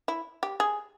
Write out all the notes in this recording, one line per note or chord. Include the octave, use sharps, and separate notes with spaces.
E4
G4
G#4